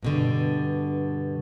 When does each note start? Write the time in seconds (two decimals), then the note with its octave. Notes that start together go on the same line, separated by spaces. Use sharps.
0.03 G2 B2 D3